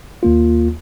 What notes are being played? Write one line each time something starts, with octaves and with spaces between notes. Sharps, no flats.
D#2 A#3 F4